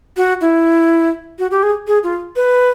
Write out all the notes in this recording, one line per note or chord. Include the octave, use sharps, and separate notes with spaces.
F#4
E4
F#4
G4
G#4
G#4
F4
B4